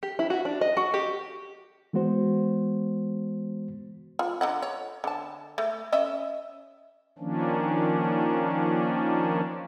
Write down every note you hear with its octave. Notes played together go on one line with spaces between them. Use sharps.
G4
E4
F#4
D4
D#5
F#4
G4
E3 G#3 B3 F#4 C5
F4
D3 D#4 F#5
C#5
D3 A5
A3
C#4 D#5 E5
D#3 F3 A#3 C#4 D4